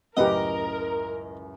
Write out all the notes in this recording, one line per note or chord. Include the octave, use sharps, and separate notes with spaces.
C#2 F#2 A2 G4 A#4 B4 D#5 F#5